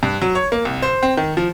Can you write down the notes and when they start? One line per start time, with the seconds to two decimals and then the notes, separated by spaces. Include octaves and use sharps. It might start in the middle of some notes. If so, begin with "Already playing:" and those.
0.03 G2
0.22 F#3
0.35 C#5
0.52 A#3
0.65 C2
0.82 C5
1.03 C4
1.17 D#3
1.37 F3